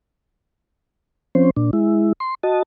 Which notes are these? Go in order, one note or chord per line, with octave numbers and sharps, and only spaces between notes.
F3 C4 C#4 C5
A#2 D4
G#3 E4
C6
F#4 D#5 A5